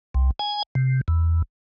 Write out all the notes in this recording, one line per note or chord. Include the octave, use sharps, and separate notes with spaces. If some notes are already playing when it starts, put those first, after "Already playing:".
C2
G#5
C3
E2